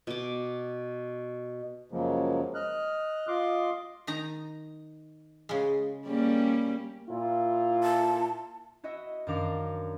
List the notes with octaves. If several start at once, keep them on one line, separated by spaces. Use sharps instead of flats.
B2 D6
F#2 C#3 F3 F#3 G#3 A#3
D#5 F6 F#6
F4 D#5 C6 D6
D#3 D#4 A#5
C#3 G#3
G3 A#3 C#4
A#2 E4 F4
A5
E4 F#4 D#5 E5
F#2 D#3 D4 A#4 F5 D6